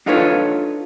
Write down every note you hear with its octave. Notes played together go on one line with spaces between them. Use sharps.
D4 D#4 F4 A4 B4 C#5